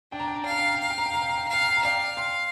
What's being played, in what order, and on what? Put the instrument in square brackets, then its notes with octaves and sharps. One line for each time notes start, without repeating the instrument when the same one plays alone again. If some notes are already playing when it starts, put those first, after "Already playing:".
[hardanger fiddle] D4 [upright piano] G5
[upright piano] A#5
G5
A#5
[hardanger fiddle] F5 [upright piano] G5
[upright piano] A#5
G5
A#5
G5
[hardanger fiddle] F5 [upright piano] A#5
[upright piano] G5
A#5
G5
A#5
G5
A#5
G5
A#5
[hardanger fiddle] F5 [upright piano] G5
[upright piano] A#5
G5
A#5
[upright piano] D5 G5 [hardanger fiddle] F5
[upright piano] G5 C6